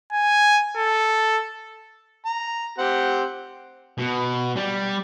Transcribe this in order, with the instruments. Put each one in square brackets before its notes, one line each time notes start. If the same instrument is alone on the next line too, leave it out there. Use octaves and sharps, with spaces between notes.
[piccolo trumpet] G#5
A4
[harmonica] A#5
C4 G4 F#5
[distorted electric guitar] B2
G3